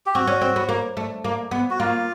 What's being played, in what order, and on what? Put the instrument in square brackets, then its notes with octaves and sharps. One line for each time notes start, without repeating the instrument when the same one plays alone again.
[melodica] G4
[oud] C4 [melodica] F#4
[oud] C#4
C4
B3
A#3
A3
A#3
B3
[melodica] F#4
[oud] A#3 [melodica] F4